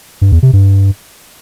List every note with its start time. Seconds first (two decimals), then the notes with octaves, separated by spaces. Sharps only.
0.21 G2
0.32 E2
0.43 C3
0.53 G2